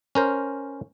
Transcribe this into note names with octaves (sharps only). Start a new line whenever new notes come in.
C#4 A#4 C5